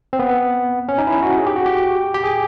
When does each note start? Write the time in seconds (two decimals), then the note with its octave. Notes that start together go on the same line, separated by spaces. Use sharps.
0.13 C4
0.19 B3
0.89 C#4
0.98 D#4
1.07 E4
1.23 F#4
1.37 G#4
1.46 G4
1.56 F#4
1.66 G4
2.14 G4
2.24 G#4